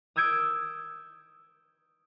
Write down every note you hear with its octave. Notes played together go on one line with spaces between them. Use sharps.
D#6 E6 G6 G#6 D7